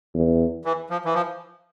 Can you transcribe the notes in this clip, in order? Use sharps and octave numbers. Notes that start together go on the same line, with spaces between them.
E2
E3
F3
E3
F3